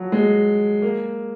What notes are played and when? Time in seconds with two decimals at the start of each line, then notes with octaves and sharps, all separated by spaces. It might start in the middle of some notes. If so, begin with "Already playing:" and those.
Already playing: F3 F#3
0.12 G#3
0.82 A#3